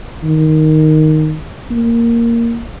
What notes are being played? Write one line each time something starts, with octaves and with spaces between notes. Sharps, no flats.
D#3
A#3